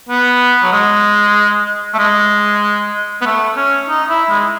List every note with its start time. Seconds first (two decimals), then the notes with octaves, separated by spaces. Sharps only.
0.09 B3
0.63 F#3
0.72 G#3
1.94 A3
1.98 G#3
3.21 B3
3.26 A3
3.57 C#4
3.89 D#4
4.09 E4
4.30 G#3